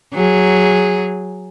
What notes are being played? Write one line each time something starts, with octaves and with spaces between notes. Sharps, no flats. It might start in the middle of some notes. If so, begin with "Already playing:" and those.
F#3 G#4